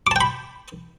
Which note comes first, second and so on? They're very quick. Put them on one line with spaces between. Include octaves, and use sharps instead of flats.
D6 A5 G5 B5